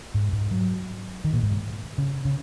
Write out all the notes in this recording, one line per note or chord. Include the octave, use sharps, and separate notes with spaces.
G#2
G#2
F#3
D#3
A#2
G#2
C#3
C#3